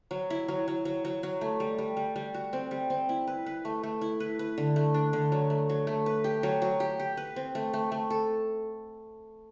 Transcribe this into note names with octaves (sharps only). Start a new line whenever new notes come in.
F#3
E4
F#3
F#3
F#3
F#3
F#3
A3
G3
G3
G3
G3
F#4
C4
G3
C4
E4
B4
B4
A3
A3
E4
B4
B4
D3
A3
D4
D3
F#3
A3
F#3
A3
B4
G4
F#3
F#3
G4
G4
B4
C4
A3
A3
A3
A4